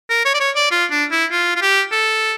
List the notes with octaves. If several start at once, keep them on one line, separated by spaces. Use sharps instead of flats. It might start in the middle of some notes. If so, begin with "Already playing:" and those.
A#4
C#5
D5
C#5
D5
F4
D4
E4
F4
F4
G4
A4